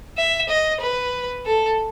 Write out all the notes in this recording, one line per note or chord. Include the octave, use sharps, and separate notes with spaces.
E5
D#5
B4
A4